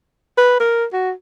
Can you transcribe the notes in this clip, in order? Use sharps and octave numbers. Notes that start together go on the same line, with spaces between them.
B4
A#4
F#4